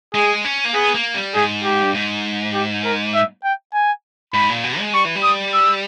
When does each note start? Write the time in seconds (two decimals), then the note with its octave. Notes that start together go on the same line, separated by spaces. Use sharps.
0.14 G#3 G#4
0.45 C#4
0.65 A#3
0.74 B3 G#4
0.94 A#3
1.14 G3
1.34 G#2 G#4
1.64 G4
1.82 G2
1.94 G#2
2.54 G4
2.85 A#4
3.14 E5
3.44 G5
3.74 G#5
4.34 G#2 B5
4.49 A#2
4.64 B2
4.79 G#3
4.94 G3 C#6
5.05 E3
5.16 G3
5.23 D#6
5.54 E6